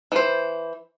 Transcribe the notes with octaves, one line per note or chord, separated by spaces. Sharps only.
E3 C5